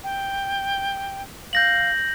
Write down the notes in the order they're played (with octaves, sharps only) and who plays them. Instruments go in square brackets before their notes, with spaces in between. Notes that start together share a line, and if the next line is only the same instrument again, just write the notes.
[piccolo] G5
[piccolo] F5 [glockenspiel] G6 A#6 F#7